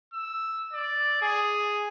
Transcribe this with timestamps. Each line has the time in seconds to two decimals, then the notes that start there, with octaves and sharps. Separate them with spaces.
0.14 E6
0.73 D5
1.22 G#4